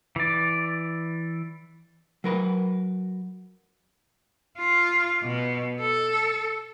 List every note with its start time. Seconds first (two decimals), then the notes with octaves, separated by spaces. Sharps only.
0.16 E3 D5
2.24 F#3 A#4 B4
4.58 F4
5.23 B2
5.80 A4